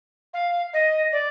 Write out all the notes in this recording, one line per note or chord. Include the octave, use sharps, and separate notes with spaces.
F5
D#5
D5